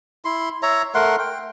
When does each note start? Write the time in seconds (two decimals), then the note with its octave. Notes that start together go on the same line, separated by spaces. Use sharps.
0.25 E4 C6
0.63 C#5 E5 A#5
0.95 A3 A#4 F#5 C6
1.19 G5